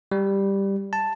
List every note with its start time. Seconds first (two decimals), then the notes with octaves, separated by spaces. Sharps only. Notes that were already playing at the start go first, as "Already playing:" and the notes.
0.12 G3
0.93 A5